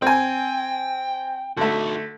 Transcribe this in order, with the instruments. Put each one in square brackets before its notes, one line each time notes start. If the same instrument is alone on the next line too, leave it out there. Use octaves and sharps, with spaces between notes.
[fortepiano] C4 G#5 [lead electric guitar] G5
[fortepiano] D3 A3 [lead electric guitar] D#4 F#4